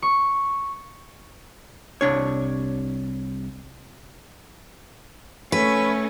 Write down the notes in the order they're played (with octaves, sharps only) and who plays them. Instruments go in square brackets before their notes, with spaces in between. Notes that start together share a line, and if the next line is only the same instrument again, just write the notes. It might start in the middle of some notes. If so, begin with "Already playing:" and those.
[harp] C#6
[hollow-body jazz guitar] C2 D4 C#5
[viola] A3 C#4 [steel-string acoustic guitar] B4